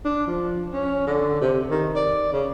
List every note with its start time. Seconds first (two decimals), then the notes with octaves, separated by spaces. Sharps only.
0.05 D4
0.27 F3
0.73 C#4
1.07 D3
1.41 C3
1.71 D#3
1.96 D5
2.32 C#3